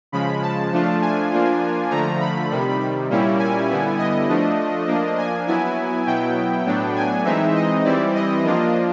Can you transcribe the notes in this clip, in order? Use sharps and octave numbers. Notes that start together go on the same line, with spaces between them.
C#3 F3 G#3 B5
A5
F3 A3 D4 F4
G#5
F3 A#3 D4 F4
D3 F3 A3 A#5
B5
C3 D#3 G3
A#2 G3 A#3 C#4 E4
G#5
D3 G3 B3 E4
D#5
F3 A3 D4
F3 A#3 D4
G#5
F#3 B3 E4 G#5
B2 F#3 B3 E4 G5
A2 F#3 B3 D4
G#5
E3 G#3 C4 D#4 E5
D#5
E3 G3 C4 E4 D5
D#5
F3 A#3 D4 F4